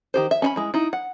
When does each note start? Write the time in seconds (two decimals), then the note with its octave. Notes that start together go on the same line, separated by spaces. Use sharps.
0.14 D#3 G4 C5
0.31 E5
0.42 C#4 E5 B5
0.56 G#3 E4
0.74 D#4 E4
0.93 F#5